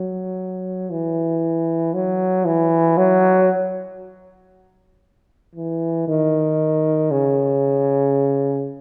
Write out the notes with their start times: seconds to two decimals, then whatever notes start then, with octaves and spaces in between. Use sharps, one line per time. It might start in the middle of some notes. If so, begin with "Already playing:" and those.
Already playing: F#3
0.90 E3
1.94 F#3
2.45 E3
2.97 F#3
5.55 E3
6.08 D#3
7.11 C#3